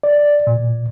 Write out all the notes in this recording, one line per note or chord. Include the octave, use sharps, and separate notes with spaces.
D5
A#2